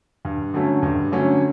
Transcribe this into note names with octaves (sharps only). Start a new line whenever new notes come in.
G2
D3 F#3 A3 C#4
G2
D3 F#3 A3 C#4